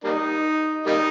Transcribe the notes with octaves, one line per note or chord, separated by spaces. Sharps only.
G3 A#3 D#4
G3 A#3 D#4